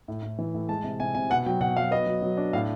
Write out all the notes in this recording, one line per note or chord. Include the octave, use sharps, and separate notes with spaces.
A2
A2
E3
A2
G#3 A5
C3
C3 G#5
C3 G#5
B2 F#5
F#3 G5
B2 F#5
F#3 F5
B3 D#5
F#3
F#3
D4
A2 F5